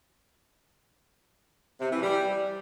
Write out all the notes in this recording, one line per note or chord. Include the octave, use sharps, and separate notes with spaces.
C3
E3
G3